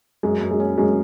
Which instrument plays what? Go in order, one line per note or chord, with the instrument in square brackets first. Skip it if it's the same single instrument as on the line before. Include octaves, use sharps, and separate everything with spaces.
[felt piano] F#2 [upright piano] G#3
[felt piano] F#2
[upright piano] G#3
[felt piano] C#4
[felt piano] F#2 [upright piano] G#3